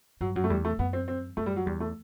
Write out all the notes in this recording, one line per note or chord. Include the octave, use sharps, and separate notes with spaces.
G2 F#3
F#2 F#3
A3
E2 G3
A3
F#2 B3
C4
C4
F#2 A3
G3
F#3
E2 G3
A3